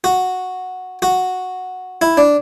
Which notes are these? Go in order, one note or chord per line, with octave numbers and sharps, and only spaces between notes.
F#4
F#4
E4
D4